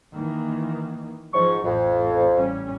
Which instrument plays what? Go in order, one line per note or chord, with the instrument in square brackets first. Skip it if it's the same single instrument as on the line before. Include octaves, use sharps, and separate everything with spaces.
[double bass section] D#3 E3 A#3
[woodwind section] G#2 C#6 [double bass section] F3
[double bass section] A1 [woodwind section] F2
[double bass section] A1 G3 C#4